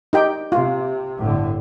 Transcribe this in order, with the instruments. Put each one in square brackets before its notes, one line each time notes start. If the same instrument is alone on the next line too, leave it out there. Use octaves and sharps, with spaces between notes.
[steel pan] D#4 G4 G5
[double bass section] C3 [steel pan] F4
[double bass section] G1 A2 D3